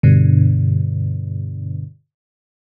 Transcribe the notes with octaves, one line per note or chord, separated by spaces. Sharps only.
G2 B2 D3